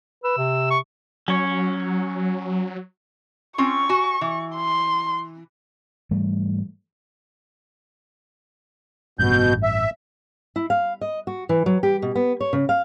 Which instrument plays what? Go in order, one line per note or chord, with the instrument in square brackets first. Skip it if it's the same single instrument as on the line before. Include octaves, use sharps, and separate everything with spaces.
[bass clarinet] B4 [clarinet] E6
[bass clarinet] C3
[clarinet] C#6
[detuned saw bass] F#3 [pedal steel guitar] C#4 C#5
[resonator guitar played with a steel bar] C4 C#4 F4 [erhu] C#6
[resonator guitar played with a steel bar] F#4 G#5
E3
[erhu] C6
[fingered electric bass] G#2 E3 G3 A3
[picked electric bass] A1 G2 [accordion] B2 G6
[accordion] E5
[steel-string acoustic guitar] E4
F5
D#5
F#4
E3
F#3
G4
B2
B3
C#5
C#3
F5